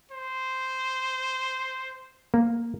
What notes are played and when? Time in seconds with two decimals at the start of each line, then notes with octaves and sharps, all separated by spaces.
0.11 C5
2.34 A#3